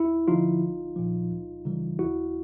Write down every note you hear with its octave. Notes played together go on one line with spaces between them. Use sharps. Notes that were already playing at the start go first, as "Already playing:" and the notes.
Already playing: D#2 E4
D3 F3 D#4 F4
A#1
A#2 F3
C#2
C#3 E3 G3
D#2 E4 F#4